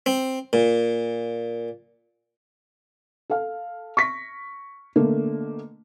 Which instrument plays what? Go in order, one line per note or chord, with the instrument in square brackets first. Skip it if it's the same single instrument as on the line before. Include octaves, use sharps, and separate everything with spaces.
[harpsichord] C4
A#2
[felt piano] A4 F5
C#6 A#6 B6
B2 D3 A3 A#3